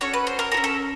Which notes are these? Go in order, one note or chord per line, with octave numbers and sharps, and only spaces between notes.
C#4 F#4 A4 C#5
B4
C5
A#4
F#4 A4 A#4
C#4
A4